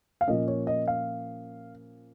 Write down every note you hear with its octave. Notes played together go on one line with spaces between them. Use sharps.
F5
A#2 F3 A#3 C#4 D#5
C#5
D#5
F5